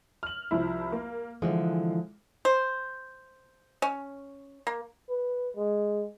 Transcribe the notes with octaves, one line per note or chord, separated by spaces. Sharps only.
F6 F#7
C2 F3 E4
A#3
D3 E3 F3 G#3
C5
C#4
A#3
B4
G#3